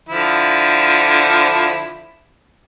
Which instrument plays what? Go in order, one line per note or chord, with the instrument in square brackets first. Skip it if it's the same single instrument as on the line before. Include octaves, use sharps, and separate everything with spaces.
[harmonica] D3 F3 E4